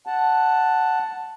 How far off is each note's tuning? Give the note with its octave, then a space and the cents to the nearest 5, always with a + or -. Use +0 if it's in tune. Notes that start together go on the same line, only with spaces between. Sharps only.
F#5 +0 A5 +0